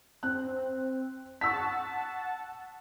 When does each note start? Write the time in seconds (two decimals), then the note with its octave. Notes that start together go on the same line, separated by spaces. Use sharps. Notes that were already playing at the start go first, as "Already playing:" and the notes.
0.23 C4 F#6
1.41 F#5 A5 C#6 E6 B6